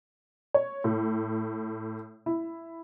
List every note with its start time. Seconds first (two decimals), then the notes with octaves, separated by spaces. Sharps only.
0.54 C#5
0.84 A2
2.26 E4